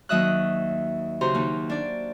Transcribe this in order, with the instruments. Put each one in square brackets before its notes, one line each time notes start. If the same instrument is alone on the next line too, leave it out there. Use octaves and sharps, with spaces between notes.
[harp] D#2 F#3 D#5 E5 D#6 F#6
C#3 F#4 G4 C5 A#5 C6
D#2 D#4
D4 D5